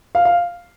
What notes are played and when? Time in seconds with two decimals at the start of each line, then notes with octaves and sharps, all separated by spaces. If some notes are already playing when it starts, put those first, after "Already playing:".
0.15 F5
0.25 F5